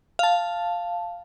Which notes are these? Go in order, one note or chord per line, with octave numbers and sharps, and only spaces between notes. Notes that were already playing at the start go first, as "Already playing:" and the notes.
F5 A5